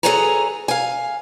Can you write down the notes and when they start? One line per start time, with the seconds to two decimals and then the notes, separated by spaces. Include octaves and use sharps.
0.03 G#4 A4 B4 C#5 G#5 A#5
0.68 F5 G#5